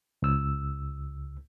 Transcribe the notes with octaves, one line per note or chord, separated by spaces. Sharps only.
C#2 E6